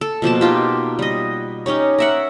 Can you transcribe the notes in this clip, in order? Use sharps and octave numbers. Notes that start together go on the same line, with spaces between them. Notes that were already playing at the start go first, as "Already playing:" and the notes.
A4
B2 F3 A#3 A5
D#4 F4 G4
G3 D#5
C#4 D#4 G4 C#5
A#4 E5 F#5